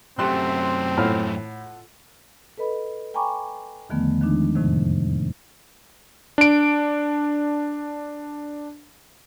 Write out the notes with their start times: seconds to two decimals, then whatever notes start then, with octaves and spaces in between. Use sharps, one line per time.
0.19 F#2 A3 C4 G4 C6 F#6
0.97 A2 F4 A4 F#5 F6
2.58 A4 B4 D#5 B5
3.14 G5 G#5 A#5 B5 C#6 D6
3.90 E2 D3 D#3 F3 A3 B3
4.21 D#3 F3 G#3 D4 D#4
4.55 F2 A2 C3 D#3 F3
6.38 D4 D7